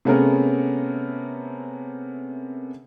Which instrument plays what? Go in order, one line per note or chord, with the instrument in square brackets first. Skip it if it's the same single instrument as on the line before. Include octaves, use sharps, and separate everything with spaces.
[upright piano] C3 A3 B3 C#4 G#4 A#4